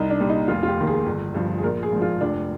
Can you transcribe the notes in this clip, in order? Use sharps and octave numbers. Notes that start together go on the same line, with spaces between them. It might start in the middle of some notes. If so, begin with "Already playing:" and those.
Already playing: C2 D#4
D4
A#2 G3
D#4
F1 F4
F4
G4
D#2 D#3
G#4
G1
G2 F3
G#4
A#1 A#4
G#4
G#2 F3
F4
F1 D4